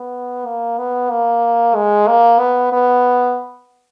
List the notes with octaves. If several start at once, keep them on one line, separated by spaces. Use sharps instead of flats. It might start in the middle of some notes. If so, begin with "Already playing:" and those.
Already playing: B3
A#3
B3
A#3
G#3
A#3
B3
B3